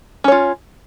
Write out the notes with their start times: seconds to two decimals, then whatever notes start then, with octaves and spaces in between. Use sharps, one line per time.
0.24 C#4
0.28 C#5
0.32 F4